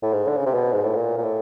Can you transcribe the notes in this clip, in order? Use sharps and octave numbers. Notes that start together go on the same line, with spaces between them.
A2
G#2
D3
C#3
C3
B2
G#2
A2
A#2
A#2
A2